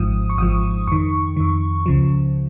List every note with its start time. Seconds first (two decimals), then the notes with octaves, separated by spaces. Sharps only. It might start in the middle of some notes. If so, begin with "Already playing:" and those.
Already playing: G#1 G#2 F3 D#6
0.30 C#6
0.38 G#1 G#2 F3 D#6
0.87 F2 D#3 C#6
1.36 F2 D#3
1.86 C#2 C#3 F3